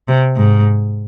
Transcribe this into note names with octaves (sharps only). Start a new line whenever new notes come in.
C3
G#2